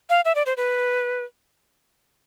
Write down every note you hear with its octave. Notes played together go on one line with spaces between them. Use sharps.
F5
E5
D5
C5
B4